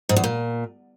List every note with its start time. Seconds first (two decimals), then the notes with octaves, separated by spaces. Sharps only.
0.09 G#2
0.16 E2
0.24 A#2